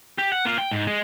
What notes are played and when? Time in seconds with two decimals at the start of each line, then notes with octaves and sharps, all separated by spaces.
0.19 G4
0.32 F#5
0.45 A#3 F4
0.58 G5
0.71 G#2
0.87 G#3